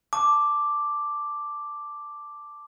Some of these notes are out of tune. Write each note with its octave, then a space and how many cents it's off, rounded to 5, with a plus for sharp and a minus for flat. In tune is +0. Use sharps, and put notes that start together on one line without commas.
A5 +0 D6 +0